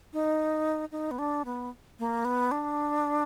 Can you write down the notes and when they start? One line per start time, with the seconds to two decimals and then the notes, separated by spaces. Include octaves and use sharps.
0.13 D#4
0.92 D#4
1.11 B3
1.19 D4
1.45 B3
1.99 A#3
2.25 B3
2.51 D4